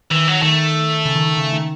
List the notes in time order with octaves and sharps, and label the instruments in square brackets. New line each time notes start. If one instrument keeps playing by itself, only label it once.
[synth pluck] D#3 [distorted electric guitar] E3
[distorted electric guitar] F#3
[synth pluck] D#3 [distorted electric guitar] A3
[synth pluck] C#3
D#3
D#3
C#3
D#3